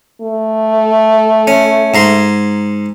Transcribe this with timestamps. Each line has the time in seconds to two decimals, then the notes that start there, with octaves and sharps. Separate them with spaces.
0.22 A3
1.47 C#4
1.94 G#2 A#5 C6